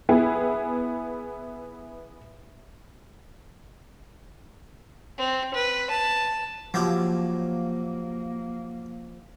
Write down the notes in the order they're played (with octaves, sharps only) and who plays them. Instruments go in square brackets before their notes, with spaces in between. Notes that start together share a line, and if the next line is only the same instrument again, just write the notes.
[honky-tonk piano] B3 E4 G#4
[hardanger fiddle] C4
B4
A5
[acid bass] F3 [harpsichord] F#3 E4 G4 [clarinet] A#3